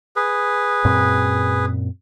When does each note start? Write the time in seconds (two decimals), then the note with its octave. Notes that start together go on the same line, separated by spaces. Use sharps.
0.16 G#4 B4
0.84 F#2 A#2 C4